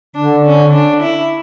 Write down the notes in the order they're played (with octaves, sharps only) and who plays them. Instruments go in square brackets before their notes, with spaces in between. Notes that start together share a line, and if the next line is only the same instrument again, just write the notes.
[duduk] D3 [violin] D4
[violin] C#4
D4
E4